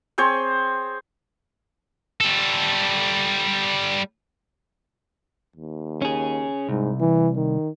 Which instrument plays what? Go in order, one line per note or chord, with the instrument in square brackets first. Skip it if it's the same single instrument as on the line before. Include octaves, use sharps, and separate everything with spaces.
[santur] C4 G#4 C5 C#5
[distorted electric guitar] G3 A4
[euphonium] D#2
[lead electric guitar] C#4 G#4
[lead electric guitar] C2 [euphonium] G#2
[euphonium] E3
D#3